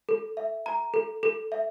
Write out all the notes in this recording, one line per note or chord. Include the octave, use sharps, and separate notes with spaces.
A4
E5
A#5
A4
A4
E5